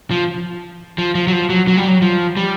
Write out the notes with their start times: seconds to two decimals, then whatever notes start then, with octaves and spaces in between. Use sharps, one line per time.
0.11 F3
0.98 F3
1.15 F3
1.28 F#3
1.33 F3
1.50 F#3
1.68 F#3
1.77 G3
1.88 F#3
2.02 F3
2.37 G3